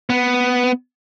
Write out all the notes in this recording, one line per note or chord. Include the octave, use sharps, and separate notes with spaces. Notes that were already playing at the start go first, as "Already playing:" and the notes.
B3